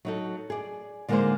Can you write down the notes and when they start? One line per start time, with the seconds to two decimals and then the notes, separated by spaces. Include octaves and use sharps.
0.05 F#3 D#4 A4
0.50 G#4 D5
1.08 D3 G#3 A#3 D#4 G#4 C5